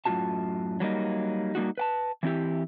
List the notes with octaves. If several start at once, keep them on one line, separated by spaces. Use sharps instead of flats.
F#2 A2 D#3 F4 F#4 A5
F#3 G3 A#3 D#4
G3 A#3 D#4 F#4
B4 G5 A5
E3 C4 E4 G4